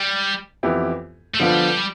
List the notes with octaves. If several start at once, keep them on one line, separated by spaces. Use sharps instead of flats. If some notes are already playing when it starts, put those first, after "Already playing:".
Already playing: G3
F2 E3 B3 E4 G4
A3
D3 F3 G3 B3 F4